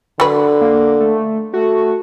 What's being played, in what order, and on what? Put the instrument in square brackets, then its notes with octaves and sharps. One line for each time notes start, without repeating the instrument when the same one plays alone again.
[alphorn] D3 [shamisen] F#3 B4
[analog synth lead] A#3
A3
[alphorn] A3 [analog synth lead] F#4